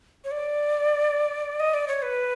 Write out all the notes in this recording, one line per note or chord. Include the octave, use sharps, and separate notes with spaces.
C#5
D5
D#5
D5
C#5
B4